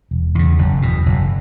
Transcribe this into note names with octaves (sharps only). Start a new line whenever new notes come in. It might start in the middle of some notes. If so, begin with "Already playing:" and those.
E1
E2 C#3
F#1
E2 B2
F#1